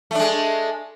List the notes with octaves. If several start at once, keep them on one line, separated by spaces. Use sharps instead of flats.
G#3 A3 D4